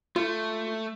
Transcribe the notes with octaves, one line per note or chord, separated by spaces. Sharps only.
A3 F4